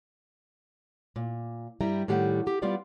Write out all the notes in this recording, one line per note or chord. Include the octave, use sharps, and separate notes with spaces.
A#2
G2 G3 E4 G5 A#5
A2 D#3 G3 G4 F#5
G4
G3 B3 F4 G4 D5 F#5